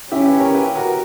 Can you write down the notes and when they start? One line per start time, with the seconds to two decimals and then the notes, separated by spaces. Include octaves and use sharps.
0.11 C#4 E4 G4
0.26 G4 B4
0.40 A#4 C#5
0.55 G4 B4
0.75 F#4 A#4